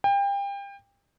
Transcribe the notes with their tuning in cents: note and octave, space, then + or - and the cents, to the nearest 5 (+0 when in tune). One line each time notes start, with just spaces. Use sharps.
G5 +30